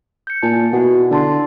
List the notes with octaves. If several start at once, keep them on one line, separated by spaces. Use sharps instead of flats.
G6 C#7
A#2 G#5 A5
B2 E4 F#4 F#5
D3 D5 A5 C6